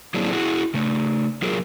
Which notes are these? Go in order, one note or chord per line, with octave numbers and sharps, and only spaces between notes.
F#3 A#3 C4 D4 E4 G#4
E4 F#4 G#4
C#3 A3
F#3 F4 G#4 A#4